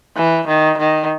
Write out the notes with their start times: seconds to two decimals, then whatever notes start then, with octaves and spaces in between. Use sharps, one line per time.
0.17 E3
0.48 D#3
0.78 D#3